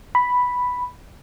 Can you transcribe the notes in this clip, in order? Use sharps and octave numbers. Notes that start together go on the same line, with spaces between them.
B5